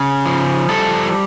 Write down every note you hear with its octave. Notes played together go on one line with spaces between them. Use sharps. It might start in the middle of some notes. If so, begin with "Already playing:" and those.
Already playing: C#3 G#4
F3
G3 A4